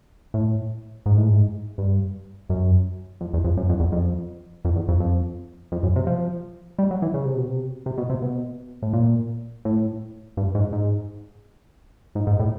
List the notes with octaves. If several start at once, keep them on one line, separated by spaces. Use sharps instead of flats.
A2
G#2
A2
G#2
G2
F#2
F2
E2
F2
F#2
F2
E2
F2
F2
E2
F2
F2
F2
F#2
C3
F3
G3
F#3
E3
C#3
C3
B2
C3
C3
B2
C3
B2
A2
A#2
A2
G2
G#2
G#2
G#2
G#2
A2